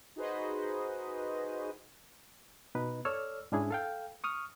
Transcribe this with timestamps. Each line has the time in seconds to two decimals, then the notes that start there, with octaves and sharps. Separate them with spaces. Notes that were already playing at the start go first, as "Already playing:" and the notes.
0.16 D#4 F#4 G#4 B4 C5 D#5
2.75 B2 D#4 B4
3.05 A4 C#5 D5 E6 F6
3.52 G#2 C#4 D4 E4 G#4
3.70 A4 F5 G5
4.24 C#6 D#6 F6